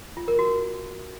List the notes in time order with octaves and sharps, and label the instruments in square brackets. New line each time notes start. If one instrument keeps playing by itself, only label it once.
[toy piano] F4
A#4
F#4